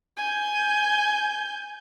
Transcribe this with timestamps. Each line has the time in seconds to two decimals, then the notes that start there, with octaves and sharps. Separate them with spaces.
0.17 G#5 G6